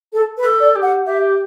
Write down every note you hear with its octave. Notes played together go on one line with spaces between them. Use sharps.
A4
B4
A4
D5
G4
F#5
G4 E5